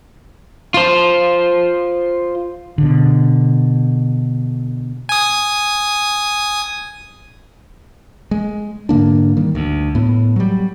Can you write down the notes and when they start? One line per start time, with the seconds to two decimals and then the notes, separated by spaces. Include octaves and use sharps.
0.74 F4 C5
2.78 B2 D3
5.09 G#5 D#6
8.31 G#3
8.89 G#2 D3 A#3 D4
9.37 D#3 G3
9.55 D2
9.95 A2 B3
10.36 F#3 G3